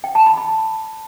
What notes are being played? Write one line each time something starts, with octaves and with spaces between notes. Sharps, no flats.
G5
A5
B5
B5